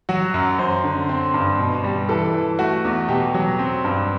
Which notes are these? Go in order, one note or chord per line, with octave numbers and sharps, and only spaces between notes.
F#3 F#4
F#2
F#2 C5
D3
C4
G2
B2
G3
E3 A4
E3
A3 F#4
E2
B2 G4
F#3
C4
G2